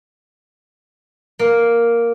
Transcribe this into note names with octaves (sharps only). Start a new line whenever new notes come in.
A#3